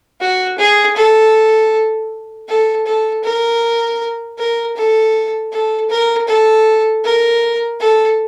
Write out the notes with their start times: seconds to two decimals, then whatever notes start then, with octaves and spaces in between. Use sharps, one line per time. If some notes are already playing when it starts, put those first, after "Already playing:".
0.21 F#4
0.58 G#4
0.96 A4
2.48 A4
2.86 A4
3.24 A#4
4.38 A#4
4.76 A4
5.53 A4
5.90 A#4
6.28 A4
7.04 A#4
7.80 A4